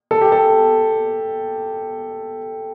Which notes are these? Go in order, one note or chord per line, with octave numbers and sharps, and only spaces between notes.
A4
G4
A4